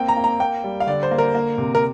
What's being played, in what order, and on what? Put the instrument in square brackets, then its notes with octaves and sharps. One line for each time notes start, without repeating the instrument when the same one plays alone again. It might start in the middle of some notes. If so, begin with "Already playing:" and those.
Already playing: [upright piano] A#3 C4 G5
A#5
A#3
A#5
A#3 G5
G3
F5
D3 D5
C5
A#3
A#4
A#3
C3
A#4